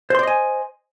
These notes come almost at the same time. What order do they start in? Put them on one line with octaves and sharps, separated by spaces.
C5 C6 D5 D#5 G#5